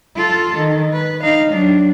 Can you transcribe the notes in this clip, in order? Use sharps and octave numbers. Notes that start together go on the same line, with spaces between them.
F4 A4
D#3
B4
D#4 F5
F#3 D4